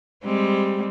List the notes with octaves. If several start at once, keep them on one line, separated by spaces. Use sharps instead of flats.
G3 G#3 C4